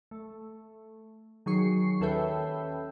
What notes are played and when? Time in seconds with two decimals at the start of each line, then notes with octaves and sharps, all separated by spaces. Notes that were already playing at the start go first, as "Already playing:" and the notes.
0.11 A3
1.46 D#3 F#3 G#4 C#6 C7 C#7
2.00 D#2 C#4 A4 B4 E5 G5